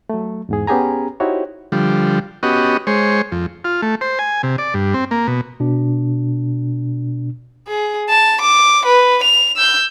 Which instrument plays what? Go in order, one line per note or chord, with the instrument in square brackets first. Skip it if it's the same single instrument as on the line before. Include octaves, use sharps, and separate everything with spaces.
[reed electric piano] F#3 A3
E2 G#2 G#4
B3 C#4 G4 G#4 G#5 A#5
D#4 E4 F#4 G4 C5 C#5
[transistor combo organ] D3 F3 G3
B3 C#4 F#4 G4 D#5
G#3 C5 C#5
F2
F4
A3
C5
G#5
C3
D5
G2
C4
A#3
B2
[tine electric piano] B2 D4
[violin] G#4
A5
D6
B4
F7
E6 G6